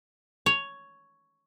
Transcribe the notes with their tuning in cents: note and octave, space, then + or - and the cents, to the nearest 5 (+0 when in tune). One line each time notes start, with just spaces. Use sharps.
C#5 +5